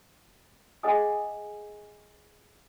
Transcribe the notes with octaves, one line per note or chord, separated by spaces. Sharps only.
G#4 D#5 F#5 G#5 D#6